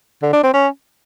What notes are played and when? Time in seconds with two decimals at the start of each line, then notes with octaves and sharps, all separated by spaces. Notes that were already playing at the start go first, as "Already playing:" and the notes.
0.23 D3
0.33 D4
0.43 C4
0.54 C#4